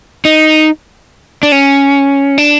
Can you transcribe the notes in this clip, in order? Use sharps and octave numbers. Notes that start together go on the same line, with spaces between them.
D#4
D4
C#4
D4